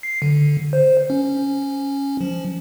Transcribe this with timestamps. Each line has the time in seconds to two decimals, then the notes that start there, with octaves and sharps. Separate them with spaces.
0.03 C7
0.22 D3
0.73 C5
1.10 C#4
2.21 F3